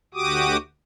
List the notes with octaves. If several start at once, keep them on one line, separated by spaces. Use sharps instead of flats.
D2 F#4 G4 D6 D#6